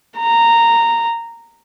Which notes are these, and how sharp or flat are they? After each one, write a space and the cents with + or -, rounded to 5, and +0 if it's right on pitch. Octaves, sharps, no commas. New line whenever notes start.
A#5 -10